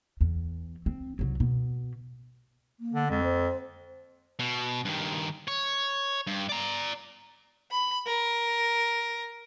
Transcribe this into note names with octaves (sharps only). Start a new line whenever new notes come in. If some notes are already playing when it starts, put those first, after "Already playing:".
E2
C4
C2 F#3
B2
A#3
D3
F2 G#3
C5
B2
G2 D#3
C#5
G2
D5 A#5
B5
A#4